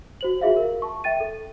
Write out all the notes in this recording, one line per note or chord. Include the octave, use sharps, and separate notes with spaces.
F#4 C5 F#7
F4 F#4 G#4 E5 F5
A#4
A5 C#6
E5 G5 A6 D#7
A4